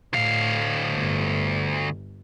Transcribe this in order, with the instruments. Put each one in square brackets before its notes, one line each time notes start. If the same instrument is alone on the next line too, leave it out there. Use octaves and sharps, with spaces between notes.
[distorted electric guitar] D2 F5 [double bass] A2
[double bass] G1